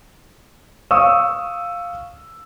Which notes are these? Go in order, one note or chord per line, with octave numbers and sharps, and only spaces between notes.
F5 C#6 D#6 E6